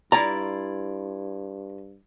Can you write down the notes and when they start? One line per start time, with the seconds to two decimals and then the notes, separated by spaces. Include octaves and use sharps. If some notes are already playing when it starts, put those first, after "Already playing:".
0.12 G2 E4 F4 D5 A#5